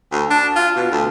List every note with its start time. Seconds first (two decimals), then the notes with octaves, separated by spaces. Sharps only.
0.12 D2
0.30 D4
0.56 F4
0.76 B2
0.91 D2